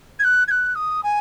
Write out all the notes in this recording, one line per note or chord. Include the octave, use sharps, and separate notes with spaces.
G#6
F#6
G#6
F#6
D#6
G#5